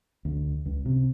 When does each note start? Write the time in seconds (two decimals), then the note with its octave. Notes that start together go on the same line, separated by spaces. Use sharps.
0.25 D2
0.65 C#2
0.85 C3